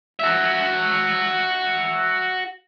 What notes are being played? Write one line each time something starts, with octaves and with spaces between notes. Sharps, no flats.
F#4 E5